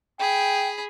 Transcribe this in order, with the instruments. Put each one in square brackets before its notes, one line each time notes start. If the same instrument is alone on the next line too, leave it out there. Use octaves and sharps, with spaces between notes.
[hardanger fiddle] G#4 B5 [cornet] G5